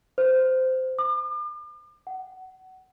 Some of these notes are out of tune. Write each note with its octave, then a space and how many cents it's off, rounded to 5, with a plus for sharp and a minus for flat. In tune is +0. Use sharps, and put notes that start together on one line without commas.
C5 -15
D6 +40
F#5 +20